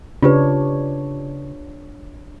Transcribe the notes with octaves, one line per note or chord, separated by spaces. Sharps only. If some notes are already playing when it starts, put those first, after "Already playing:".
C#3 D4 F4 G4 B4 C#5